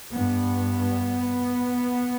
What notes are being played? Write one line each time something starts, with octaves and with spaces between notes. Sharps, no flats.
G2 B3